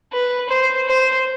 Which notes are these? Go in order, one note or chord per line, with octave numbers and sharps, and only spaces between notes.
B4
C5
C5